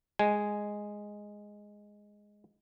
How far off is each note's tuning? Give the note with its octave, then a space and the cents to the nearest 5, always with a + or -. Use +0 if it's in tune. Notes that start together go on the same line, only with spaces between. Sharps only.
G#3 +0 G#5 +0